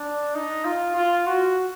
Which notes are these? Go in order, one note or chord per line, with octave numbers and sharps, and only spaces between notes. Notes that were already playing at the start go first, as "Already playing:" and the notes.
Already playing: D4
D#4
F4
F4
F#4